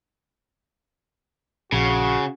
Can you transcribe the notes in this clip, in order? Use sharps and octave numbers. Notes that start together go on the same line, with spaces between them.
A#1 C#3 F#4